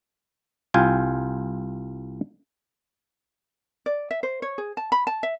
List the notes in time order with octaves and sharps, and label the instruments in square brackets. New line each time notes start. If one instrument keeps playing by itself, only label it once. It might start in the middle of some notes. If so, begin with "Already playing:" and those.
[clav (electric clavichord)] C2 F4 G5 G#5
[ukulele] D5
E5
C5
C#5
G#4
A5
B5
A5
E5